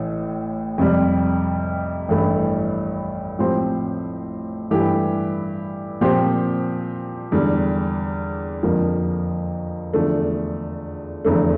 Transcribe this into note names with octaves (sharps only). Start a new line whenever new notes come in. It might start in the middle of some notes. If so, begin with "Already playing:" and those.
Already playing: A1 A2 E3
F2 C3 G3
A1 G2 E3 A3 E4
A2 F3 C4 G4 C5
G2 E3 A3 E4 G4
A#2 F3 C4 G4 C5
E2 D3 G3
F2 D3 F3 A#3
E2 D3 F3 A3
F1 E2 D3 A3